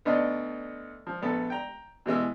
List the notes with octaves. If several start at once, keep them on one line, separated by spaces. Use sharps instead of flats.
D2 B3 D4 D#4 D#5
F3
A#1 B3 A4 A5
G5 A#5
B2 E3 G#3 E6